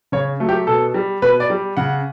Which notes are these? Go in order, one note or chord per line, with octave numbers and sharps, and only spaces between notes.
C#3 C#5
F#3 A3
G4
B2 A4
G3
B2 B4
D5
G3
C#3 F#5